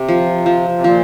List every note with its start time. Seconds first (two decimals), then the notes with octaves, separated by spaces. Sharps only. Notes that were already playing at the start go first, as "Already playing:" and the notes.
Already playing: C3
0.08 F3
0.46 F3
0.77 C3
0.84 A#2 F3